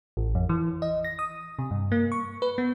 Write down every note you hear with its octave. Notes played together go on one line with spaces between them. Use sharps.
A1
F2
E3
D#5
A#6
D#6
C3
G2
A#3
C#6
B4
B3